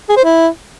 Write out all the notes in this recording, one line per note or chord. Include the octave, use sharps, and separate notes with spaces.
G#4
C5
E4